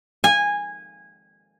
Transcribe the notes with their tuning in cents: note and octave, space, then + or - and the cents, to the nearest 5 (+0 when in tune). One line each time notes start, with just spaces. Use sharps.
G#5 -15